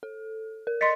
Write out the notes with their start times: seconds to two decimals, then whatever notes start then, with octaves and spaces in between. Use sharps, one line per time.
0.03 A4
0.67 A#4
0.81 D#5 C6 A6 B6 C#7